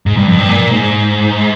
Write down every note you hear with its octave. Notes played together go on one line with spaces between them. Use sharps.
G#2
G2
F2
G2
A#2
G#2